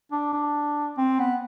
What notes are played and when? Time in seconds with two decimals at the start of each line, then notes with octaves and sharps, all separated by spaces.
0.12 D4
0.33 D4
0.98 C4
1.19 B3